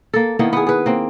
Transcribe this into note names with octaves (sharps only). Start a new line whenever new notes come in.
A#3 A4
D#3 A#3 B3 E4
B3 G#4
G#4 B4
A#3 C4